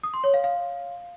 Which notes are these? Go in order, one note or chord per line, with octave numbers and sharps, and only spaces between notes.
D#6
C6
C#5
F5
F5